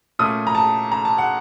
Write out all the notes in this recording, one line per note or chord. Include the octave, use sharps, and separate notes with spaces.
A#2 A3 C#4 D#6
A#5
A5
A#5
A5
F#5